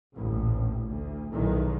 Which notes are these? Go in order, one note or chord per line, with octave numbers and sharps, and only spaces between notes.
A1 D2 A#2
D2
B1 E2 D#3 E3